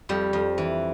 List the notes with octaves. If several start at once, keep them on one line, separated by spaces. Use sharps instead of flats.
F2 G3
F2
E3